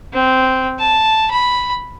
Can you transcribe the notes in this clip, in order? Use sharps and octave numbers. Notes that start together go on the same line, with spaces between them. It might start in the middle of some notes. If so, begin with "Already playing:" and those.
C4
A5
B5